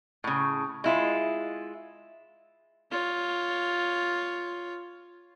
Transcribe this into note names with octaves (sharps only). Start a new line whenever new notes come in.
A2 C#3
G#3 E4 F4
F4 C#5